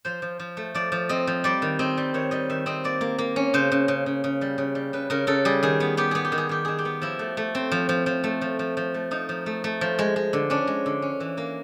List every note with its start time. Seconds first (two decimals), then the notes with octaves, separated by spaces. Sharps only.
0.05 F3 C5
0.22 F3
0.39 F3
0.57 A3
0.74 F3 D5
0.92 F3
1.09 C4 D#5
1.27 F3
1.44 G3 D5
1.62 D#3
1.79 C4 D#5
1.97 G3
2.14 D#3 C#5
2.31 G3 D#5
2.50 D#3 E5
2.66 C4 D#5
2.84 A#3 D5
3.01 A#3
3.18 A#3
3.36 C#4
3.54 C#3 C5
3.72 C#3
3.88 C#3
4.06 C#3
4.24 C#3
4.41 G3
4.58 C#3
4.75 G3
4.93 C#3 B4
5.10 C#3 A#4
5.27 C#3 A4
5.45 G3 G#4
5.63 D#3 G#4
5.80 B3
5.97 B3 G4
6.11 B3 G#4
6.25 G4
6.32 D#3
6.38 G#4
6.49 D#3 G4
6.65 D#3 G#4
6.78 G4
6.85 B3
7.02 F3 E4
7.19 A3
7.37 A3
7.55 C4
7.71 F3
7.89 F3
8.06 F3
8.24 A3
8.41 F3
8.59 F3
8.77 F3
8.94 A3
9.11 F3 D#4
9.29 F3
9.46 A3
9.64 A3
9.81 F3
9.99 G#3
10.16 G#3
10.33 D3
10.50 C#4 D4
10.67 G#3
10.86 D3
11.02 C#4
11.20 E3
11.37 A#3